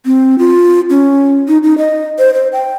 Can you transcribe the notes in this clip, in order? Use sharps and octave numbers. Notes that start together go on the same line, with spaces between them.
C4
F4
C#4
D#4
D#4
D#5
C5
C5
G5